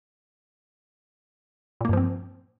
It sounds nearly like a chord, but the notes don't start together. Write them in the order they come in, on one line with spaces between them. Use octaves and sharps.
A#2 A#3 G2 F3 C4